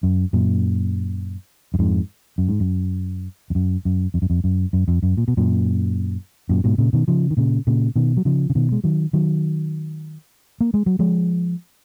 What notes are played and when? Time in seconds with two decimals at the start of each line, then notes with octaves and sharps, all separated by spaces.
0.03 F#2
0.33 F#2 A#2
1.74 F#2
1.79 F2 G#2
2.38 F#2
2.49 G#2
2.60 F#2
3.50 F2
3.55 F#2
3.85 F#2
4.14 F2
4.22 F#2
4.30 F2
4.44 F#2
4.73 F#2
4.88 F2
5.03 F#2
5.17 A#2
5.28 B2
5.37 F#2 A#2
6.49 F#2 A#2
6.64 G#2 B2
6.78 A#2 C#3
6.93 B2 D#3
7.08 C#3 F3
7.31 D#3
7.37 A#2 C#3
7.67 A#2 C#3
7.96 B2 D#3
8.17 F#3
8.25 C#3 F3
8.50 C#3
8.55 B2 D#3
8.72 G#3
8.84 D#3 F#3
9.13 D#3 F#3
10.61 A#3
10.74 G#3
10.86 F#3
10.99 F3 G#3